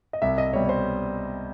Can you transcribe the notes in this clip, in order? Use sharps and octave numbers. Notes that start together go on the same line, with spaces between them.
D#5
C2 E5
D#5
B2 G3 C#5
C#5
C5